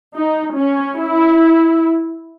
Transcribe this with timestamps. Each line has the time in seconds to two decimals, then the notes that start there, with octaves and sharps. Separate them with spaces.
0.16 D#4
0.56 C#4
0.98 E4